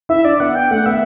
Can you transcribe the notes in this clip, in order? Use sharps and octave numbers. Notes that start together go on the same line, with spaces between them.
E4 E5
D4 D5
B3 F#5
G5
A3 F#5
B3 E5